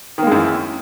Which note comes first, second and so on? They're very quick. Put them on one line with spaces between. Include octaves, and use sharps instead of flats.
D#3 A#3 G#3 F#2 E3